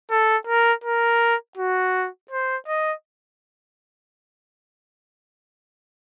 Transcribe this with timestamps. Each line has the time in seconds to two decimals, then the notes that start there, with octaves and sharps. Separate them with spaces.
0.11 A4
0.47 A#4
0.84 A#4
1.57 F#4
2.31 C5
2.68 D#5